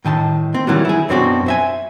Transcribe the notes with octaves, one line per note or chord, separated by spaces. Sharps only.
A2 D#3 G#5 A5
C4
D#3 E3 F#3 G3
E4 G#4
F#2 B2 C4 D4 E4 F#4
C5 E5 G#5